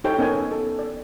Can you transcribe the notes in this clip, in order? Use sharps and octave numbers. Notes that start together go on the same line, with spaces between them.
D#4 G4 A4 C5 C#5 G5
B3 C#4 D#4 A#4 G#5
A4
D5